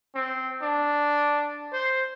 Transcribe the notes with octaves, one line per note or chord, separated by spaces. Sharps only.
C4
D4
C5